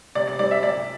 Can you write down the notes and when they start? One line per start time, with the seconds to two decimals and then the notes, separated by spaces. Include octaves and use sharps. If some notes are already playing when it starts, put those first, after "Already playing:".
0.15 C3 D5
0.27 D5
0.39 G3 C4 D5
0.51 E5
0.63 C3 D5